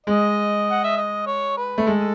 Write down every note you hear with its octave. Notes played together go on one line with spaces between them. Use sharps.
G#3 D#5
F#5
E5
D#5
C#5
B4
A3
G#3 A4